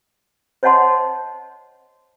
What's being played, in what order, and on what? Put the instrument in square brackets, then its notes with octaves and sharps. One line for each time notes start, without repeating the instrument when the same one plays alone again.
[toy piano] C5 C#5 D#5 F#5 A5 C6